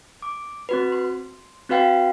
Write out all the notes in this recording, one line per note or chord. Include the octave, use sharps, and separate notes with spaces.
D6
C4 F#4 B4
C6
C4 F#4 B4 F5 G5 C7